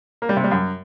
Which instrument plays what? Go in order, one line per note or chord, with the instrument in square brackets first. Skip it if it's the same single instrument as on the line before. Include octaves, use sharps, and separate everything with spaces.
[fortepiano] A#3
G3
C3
G3
F#2